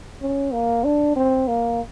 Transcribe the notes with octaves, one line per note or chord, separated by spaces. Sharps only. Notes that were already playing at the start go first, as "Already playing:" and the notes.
C#4
A#3
D4
C4
A#3